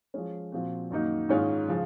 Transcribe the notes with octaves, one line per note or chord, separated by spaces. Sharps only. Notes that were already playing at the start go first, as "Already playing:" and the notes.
F3 G#3 C#4
A#2 F3 C4 F#4
F#2 D#3 A#3 D#4 F#4
G#2 D#3 G#3 C#4 F4
C#3 F3 G#3